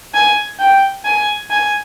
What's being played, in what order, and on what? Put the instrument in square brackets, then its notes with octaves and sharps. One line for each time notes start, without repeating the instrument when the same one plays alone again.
[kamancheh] G#5
G5
G#5
G#5